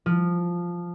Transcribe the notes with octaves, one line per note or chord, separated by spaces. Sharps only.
F3